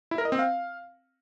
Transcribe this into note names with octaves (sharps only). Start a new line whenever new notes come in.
E4
A#4
D#5
C4
F5